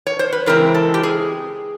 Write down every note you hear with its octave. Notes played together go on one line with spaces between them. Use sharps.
C#5
C5
B4
C#3 E3 G#3 C4 E4 A#4
A4
G4
G#4